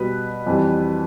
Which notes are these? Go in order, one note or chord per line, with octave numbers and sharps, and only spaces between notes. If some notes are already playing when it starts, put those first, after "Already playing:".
Already playing: B2 G3 B4
F2 E3 G3